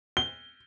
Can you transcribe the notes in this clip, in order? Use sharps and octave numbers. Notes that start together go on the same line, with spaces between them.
G7